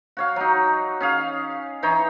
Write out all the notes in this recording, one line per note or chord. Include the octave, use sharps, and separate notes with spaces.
F#4 C#5 F5
F#3 D#4
C#4 G#4 F5
E3 D#4 C#5 C6